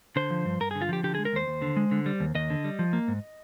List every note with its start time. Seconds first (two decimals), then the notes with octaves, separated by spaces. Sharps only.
0.16 D3 C5
0.31 F3
0.45 G2
0.60 G2 A#4
0.71 D3 G#4
0.82 F4
0.89 F3 G4
1.03 D3 G4
1.15 G#3 G#4
1.25 A#4
1.33 D#2 C5
1.47 D#2
1.62 D3
1.77 G#3
1.91 D3
2.06 G3
2.20 D#2
2.35 D#2 D#5
2.50 D3
2.64 G3
2.79 F3
2.93 A#3
3.08 G#2